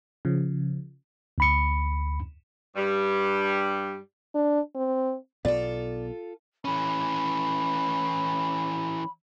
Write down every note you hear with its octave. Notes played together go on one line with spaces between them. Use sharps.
C#3 F3
D2 B5 C#7
G2 G3
D4
C4
B1 B2 B3 F4 A4 D5
E3 C#4 B5